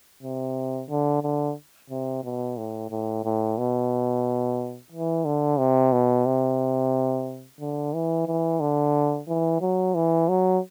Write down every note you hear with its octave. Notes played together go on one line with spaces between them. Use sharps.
C3
D3
D3
C3
B2
A2
A2
A2
B2
E3
D3
C3
B2
C3
D3
E3
E3
D3
E3
F#3
E3
F#3